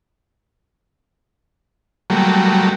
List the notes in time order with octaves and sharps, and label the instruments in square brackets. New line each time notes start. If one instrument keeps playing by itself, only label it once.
[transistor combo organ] F#3 G3 A3 A#3